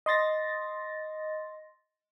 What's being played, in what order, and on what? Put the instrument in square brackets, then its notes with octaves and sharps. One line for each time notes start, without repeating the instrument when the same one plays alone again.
[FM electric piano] D#5 C6 A6 A#6